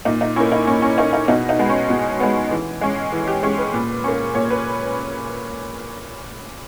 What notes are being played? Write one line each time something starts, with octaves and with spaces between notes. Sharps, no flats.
A#2 D#4
D#4
A#3 C#4 E4
D#4
A#2 C#4
C#4
A#3 C#4 D#4
D#4
B2 D#4
D#4
G#3 B3
C#4
B2
G#3 B3
E3
G#3 C#4
E3
G4
G#3 C#4 G#4
B4
A#2
A#3 C#4
A#2 C#5
B4